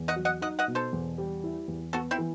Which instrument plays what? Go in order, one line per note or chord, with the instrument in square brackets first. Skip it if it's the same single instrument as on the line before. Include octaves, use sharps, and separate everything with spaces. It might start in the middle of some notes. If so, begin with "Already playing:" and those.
Already playing: [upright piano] E2
[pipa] D#5 F#5
[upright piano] F#3
[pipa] D#5 F#5
[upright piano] D#4 [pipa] D#5 F#5
[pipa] D#5 F#5
[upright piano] B2
[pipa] A4 C5
[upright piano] E2
G3
E4
E2
[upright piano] B3 [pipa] F#4 A4
[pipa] C4 E4
[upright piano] E3